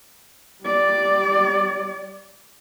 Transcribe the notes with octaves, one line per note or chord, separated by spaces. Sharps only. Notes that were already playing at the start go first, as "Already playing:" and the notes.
G3 D5